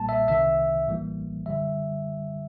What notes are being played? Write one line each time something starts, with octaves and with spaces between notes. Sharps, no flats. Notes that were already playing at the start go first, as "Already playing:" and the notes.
Already playing: B1 A#2 G3 A#3 A5
E5
C2 C3 D#3 E5
A1 A2 E3 G3 A#3
G1 F#2 D3 G3 E5